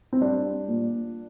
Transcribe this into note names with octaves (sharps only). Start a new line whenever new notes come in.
C4
G3 D4
A#2